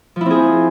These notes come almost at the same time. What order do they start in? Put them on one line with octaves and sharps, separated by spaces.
F3 E4 C4 G#4